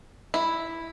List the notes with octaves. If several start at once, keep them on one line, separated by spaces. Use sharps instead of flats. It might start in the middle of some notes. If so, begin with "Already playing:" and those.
E4